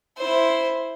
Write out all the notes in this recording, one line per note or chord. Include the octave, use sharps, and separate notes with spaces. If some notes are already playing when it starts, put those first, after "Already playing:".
E4 C5